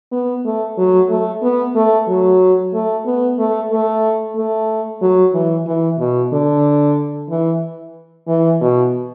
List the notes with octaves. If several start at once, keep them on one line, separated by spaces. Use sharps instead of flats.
B3
A3
F#3
A3
B3
A3
F#3
A3
B3
A3
A3
A3
F#3
E3
E3
B2
D3
E3
E3
B2